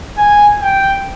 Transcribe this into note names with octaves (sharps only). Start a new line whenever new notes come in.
G#5
G5